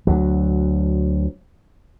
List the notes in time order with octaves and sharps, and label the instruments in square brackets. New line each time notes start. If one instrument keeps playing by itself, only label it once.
[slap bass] D2 F#3